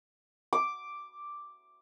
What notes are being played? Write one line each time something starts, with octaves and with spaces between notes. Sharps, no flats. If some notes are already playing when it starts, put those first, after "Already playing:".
D6